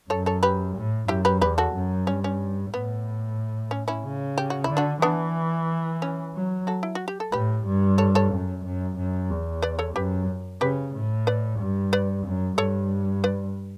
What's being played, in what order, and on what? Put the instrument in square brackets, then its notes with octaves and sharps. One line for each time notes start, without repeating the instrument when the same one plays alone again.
[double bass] F#2 [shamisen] A4 C#5
[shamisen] A4 C#5
G4 B4
[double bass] A2
[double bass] F#2 [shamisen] E4 G4
[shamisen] G4 B4
[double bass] E2 [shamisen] G4 B4
[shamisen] F#4 A4
[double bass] F#2
[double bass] G2 [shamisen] C#4
[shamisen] C#4
[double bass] A2 [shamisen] B3
[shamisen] C#4
C#4 E4
[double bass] C#3
[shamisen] G4
F#4
E4
[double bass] D3
[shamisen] D4 F#4
[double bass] E3 [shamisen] B3 D4
[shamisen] C#4
[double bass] F#3
[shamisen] F#4 A4
E4
F#4
G4
A4
[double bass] A2 [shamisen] G4 B4
[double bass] G2
[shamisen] A4 C#5
A4 C#5
[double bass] F#2
F#2
F#2
E2
[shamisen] B4 D5
A4 C#5
[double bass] F#2 [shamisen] G4 B4
[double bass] C#3 [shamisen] G4 B4
[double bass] A2
[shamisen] B4 D5
[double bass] G2
[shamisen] B4 D5
[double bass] F#2
[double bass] G2 [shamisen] A4 C#5
[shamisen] B4 D5